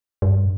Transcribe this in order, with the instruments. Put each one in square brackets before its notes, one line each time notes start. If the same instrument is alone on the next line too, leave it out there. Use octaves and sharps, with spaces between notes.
[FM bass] G2